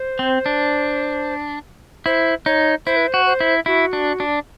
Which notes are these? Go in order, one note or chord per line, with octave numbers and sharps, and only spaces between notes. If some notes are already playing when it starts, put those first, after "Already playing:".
Already playing: C5
C4
D4
E4 C5
D#4 C#5
E4 C5
B4
C5
F#4
C5
E4
E4 F#4
D4
D4